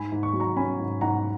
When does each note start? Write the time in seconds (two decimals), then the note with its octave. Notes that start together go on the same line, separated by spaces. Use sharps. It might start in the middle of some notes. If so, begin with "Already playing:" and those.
Already playing: G#2 G#5 B5
0.12 G#2
0.23 C#6
0.33 F#3
0.40 A#5 C#6
0.56 C#4 G#5 B5
0.80 G#2
1.01 G#2 F#5 A#5